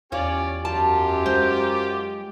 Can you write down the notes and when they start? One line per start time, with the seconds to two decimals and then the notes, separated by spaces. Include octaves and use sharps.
0.12 E2 C#4 F4 G4 C#5 D5
0.65 F#2 F4 G4 A5
1.26 G#3 C5